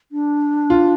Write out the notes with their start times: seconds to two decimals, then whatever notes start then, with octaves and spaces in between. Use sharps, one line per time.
0.12 D4
0.70 F4